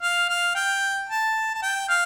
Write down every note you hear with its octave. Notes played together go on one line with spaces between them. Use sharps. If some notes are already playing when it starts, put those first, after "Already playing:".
F5
F5
G5
A5
A5
G5
F5